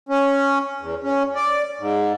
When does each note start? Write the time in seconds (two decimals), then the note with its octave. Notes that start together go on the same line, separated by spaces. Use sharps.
0.09 C#4
0.81 E2
1.04 C#4
1.35 D5
1.80 G#2